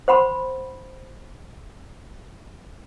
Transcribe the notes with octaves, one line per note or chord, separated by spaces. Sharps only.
C5 F#5 B5 C6